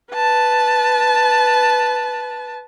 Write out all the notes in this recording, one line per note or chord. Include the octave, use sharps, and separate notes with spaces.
B4 A5